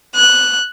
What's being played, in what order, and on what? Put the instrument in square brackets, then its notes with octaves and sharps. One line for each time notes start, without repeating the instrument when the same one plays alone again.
[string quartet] F#6